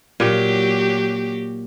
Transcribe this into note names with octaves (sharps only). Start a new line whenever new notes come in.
A#2 F#3 G4